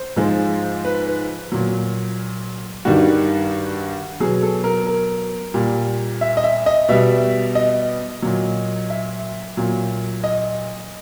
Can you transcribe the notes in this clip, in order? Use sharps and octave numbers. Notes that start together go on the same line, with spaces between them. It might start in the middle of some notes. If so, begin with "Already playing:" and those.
Already playing: C5
G#2 F3 G#3
B4
B4
A#2 F#3
G2 D#3 G3 F#4
B2 F#3 G#4
A4
A#4
A#4
A#2 G3
E5
D#5
E5
D#5
B2 G3 E5
D#5
A#2 F#3
E5
A#2 F#3
D#5